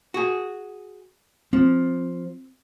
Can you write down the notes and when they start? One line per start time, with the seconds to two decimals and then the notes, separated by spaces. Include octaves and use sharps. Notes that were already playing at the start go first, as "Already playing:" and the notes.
0.14 F#4 G#4
1.53 F3 C4